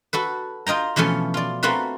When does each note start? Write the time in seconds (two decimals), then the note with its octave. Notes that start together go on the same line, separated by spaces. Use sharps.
0.13 F#4 A4 B4
0.67 F4 D#5 G5 A#5
0.96 B2 E3 F3 A3 C#4
1.34 F4 D5
1.63 A3 C4 F4 F#4 A#4 B4